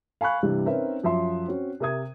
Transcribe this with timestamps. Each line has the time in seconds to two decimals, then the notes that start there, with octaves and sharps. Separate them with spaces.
0.21 F5 G#5 B5 C#6 F#6
0.43 G2 C3 E3 G3
0.66 C4 C#4 D#4 A#4 B4 E5
1.03 F#2 F3 E5 C6
1.47 C4 C#4 F#4
1.80 C3 A#4 E5 D#6 G#6